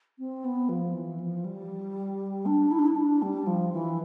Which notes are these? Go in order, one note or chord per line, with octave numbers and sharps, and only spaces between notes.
C4
B3
F3
E3
F3
G3
D4
E4
D4
E4
D4
G3
F3
E3